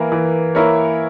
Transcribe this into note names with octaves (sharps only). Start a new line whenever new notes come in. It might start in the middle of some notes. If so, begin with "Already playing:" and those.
Already playing: E3 A#3 E4 A#4
E3
A#3 E4 A#4 C#5